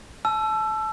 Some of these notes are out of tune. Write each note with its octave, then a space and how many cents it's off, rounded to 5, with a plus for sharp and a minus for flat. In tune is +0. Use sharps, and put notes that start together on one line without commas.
A5 -25 E6 +25